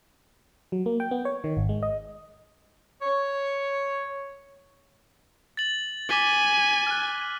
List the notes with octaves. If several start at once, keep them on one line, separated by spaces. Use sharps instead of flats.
F#3
A#3
G5
B3
C#5
D#3
G#1
G#3
D#5
C#5
A6 F#7
G#5 D6 B6 G7
F6 F#6